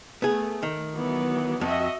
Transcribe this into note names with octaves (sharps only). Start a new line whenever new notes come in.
A3 B3 G#4
D#3
E3 F#3 B3
F2 F#4 D#5 E5